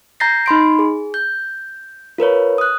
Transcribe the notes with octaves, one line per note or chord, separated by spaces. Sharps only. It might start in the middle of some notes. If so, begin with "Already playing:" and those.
A#5 G6 A6 A#6 C7
D#4 B5 C6 D7
G#4
G6
F4 A#4 B4 C#5
D#6 F#6